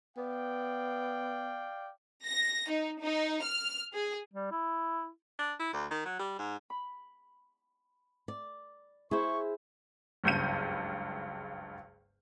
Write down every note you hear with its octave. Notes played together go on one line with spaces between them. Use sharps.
B3 D5 F5 G5
A#6
D#4
D#4
F6
G#4
G3
E4
D4
E4
D2
D#3
F#3
G3
G#2
B5
D5
E4 G#4 C5 C#6
F#1 C#2 G2 G6 D#7